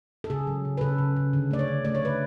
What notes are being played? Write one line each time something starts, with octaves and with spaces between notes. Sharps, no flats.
A4
C#3 G#4
F#3
C#3
B4
C#3 A4
C#3
C#3
D3
A3 D5
C#5
D3
A3 D5
C#5
D3 B4